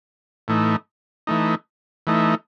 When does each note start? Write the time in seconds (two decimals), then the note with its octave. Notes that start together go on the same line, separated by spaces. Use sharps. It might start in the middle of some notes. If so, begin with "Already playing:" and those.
0.48 A2 E3 A3 D#4
1.27 E3 A3 D#4
2.07 E3 A3 D#4